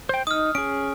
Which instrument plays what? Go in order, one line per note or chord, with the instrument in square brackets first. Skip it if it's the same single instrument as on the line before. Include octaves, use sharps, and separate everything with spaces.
[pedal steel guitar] C5 G5
[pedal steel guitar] D#4 [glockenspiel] D#6 F6
[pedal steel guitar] C#4 G#4 [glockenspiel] D7